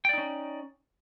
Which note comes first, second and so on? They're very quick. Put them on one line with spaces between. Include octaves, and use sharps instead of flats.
G5 D5 D#4 C#4